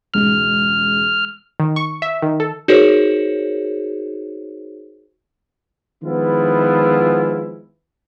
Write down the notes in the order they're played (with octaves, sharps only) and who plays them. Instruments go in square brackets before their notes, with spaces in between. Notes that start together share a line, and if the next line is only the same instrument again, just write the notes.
[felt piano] E1 C#2 G#2 [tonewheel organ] F6
[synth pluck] D#3
C#6
E5
D#3
A4
[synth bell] D#4 F#4 G#4 A#4 C5 C#5
[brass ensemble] D#3 F3 G#3 B3 E4 F4